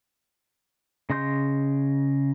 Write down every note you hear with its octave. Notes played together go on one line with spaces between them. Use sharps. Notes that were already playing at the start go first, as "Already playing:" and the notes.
C#3 D#5 C6 G6